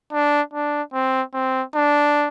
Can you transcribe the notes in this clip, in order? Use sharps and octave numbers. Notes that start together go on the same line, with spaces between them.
D4
D4
C4
C4
D4